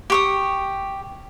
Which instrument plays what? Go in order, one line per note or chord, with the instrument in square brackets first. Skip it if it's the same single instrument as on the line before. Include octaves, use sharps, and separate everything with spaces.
[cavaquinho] G4 C#6 D#6